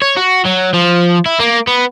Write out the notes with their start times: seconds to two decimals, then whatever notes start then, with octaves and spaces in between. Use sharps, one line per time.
0.02 C#5
0.17 F#4
0.46 F#3
0.74 F3
1.26 E4
1.39 A#3
1.67 B3